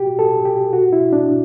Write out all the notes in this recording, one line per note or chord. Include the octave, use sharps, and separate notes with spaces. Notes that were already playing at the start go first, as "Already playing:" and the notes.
Already playing: F#4 G4
A4
G4
F#4
E4
D4